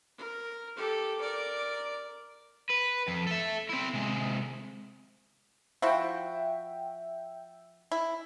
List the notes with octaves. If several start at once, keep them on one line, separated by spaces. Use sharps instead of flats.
A#4
G4 A4
A#4 D5
B4
F2
A4 E5
C4 E4
C3 G#3
F3 E4 F#4 E5 G5
E4